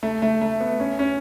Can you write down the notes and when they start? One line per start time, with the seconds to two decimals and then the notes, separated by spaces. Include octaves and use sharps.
0.03 A3
0.22 A3
0.41 A3
0.60 B3
0.80 C#4
0.99 C#4